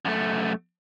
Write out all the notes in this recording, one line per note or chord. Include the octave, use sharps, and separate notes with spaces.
F#2 A3